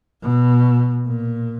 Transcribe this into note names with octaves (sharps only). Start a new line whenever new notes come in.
B2
A#2